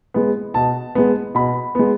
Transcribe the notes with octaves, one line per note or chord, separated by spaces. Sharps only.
G#3 B3
B2 A5
G#3 B3
B2 B5
G#3 B3